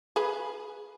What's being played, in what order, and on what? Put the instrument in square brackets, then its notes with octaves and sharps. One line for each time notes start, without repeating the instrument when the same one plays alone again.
[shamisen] G#4 B4